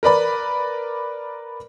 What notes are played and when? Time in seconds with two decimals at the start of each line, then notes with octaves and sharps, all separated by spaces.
0.03 A#4 B4 D5 B5